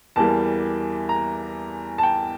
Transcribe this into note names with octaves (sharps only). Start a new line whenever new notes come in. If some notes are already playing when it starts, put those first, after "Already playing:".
E2 E3 G3 A#3 A5
A#5
A5
G5